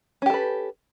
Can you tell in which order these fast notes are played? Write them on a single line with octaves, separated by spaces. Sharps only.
C#4 G4 A4 B4